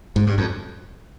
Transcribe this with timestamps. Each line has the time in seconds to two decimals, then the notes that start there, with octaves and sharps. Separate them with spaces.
0.16 G#2
0.27 G2
0.38 F2